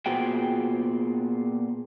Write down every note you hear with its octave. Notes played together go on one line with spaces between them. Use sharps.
A#2 B3 F#4 G#4 C5 G5